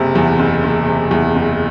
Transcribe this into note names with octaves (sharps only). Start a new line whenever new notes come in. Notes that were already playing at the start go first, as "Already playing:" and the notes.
Already playing: F#1 C3
E2
F#1
F#1
C3
E2
F#1